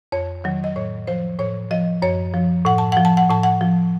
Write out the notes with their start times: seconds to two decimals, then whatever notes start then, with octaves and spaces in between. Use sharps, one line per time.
0.12 F2 C#5
0.44 D#3 F#3
0.64 D#5
0.76 A2 C#5
1.07 F3 C5
1.39 A2 C#5
1.71 F3 D#5
2.02 F#2 C#5
2.34 F3
2.65 A2 F#5
2.78 A5
2.92 F3 F#5
3.05 A5
3.17 F#5
3.29 A2 A5
3.43 F#5
3.61 F3